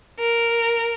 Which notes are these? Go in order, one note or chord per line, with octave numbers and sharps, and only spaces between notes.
A#4